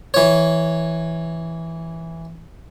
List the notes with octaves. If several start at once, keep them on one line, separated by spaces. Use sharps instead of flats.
E3 C#5